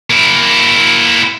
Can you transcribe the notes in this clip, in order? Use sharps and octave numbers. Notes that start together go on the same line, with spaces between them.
A#3 E4